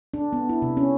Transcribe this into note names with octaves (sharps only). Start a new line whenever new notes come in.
D4
B3
E4
C3
C#4